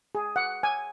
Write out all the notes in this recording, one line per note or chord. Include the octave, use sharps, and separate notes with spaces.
G#4
F#5
G#5